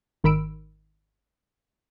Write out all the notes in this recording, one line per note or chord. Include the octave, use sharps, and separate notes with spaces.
G#1 D#3 A#4 B5 E6 D7